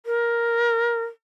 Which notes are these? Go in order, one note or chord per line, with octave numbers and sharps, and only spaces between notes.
A#4